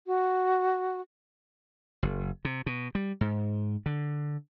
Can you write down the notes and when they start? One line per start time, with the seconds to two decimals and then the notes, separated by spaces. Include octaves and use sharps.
0.07 F#4
2.03 F#1
2.45 C3
2.66 B2
2.95 G3
3.21 G#2
3.86 D3